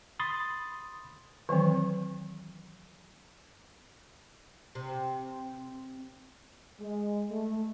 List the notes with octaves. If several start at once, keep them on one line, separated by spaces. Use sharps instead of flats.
B5 C6 D#6 A6
D#3 E3 F#3 C4
C3
G#3
A3